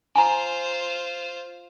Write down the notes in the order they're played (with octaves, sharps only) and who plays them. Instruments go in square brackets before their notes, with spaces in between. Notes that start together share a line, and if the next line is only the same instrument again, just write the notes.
[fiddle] F4 C5 [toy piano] G#5 A#5